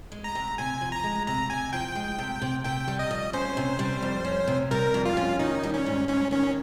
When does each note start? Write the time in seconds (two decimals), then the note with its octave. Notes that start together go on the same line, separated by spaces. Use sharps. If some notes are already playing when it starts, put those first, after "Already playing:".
0.12 G#3
0.24 A#5
0.35 C3
0.58 C3 G#5
0.81 F3
0.92 A#5
1.04 G#3
1.27 C3 A#5
1.50 C3 G#5
1.73 F3 G5
1.95 G#3
2.18 C3
2.42 C3
2.65 C3 G5
2.88 G3
2.99 D#5
3.11 F2
3.33 C#4 C5
3.57 C3
3.79 G3
4.02 F2
4.25 C#4
4.48 C3
4.71 G3 A#4
4.94 F2
5.05 F4
5.17 C#4
5.39 D#3 D#4
5.63 G3
5.74 C#4
5.86 G#2
6.08 G#2 C#4
6.31 D#3 C#4